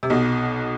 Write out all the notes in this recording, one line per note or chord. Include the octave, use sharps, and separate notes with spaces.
C3
B1 B2